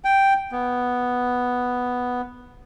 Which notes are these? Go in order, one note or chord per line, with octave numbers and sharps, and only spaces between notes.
G5
B3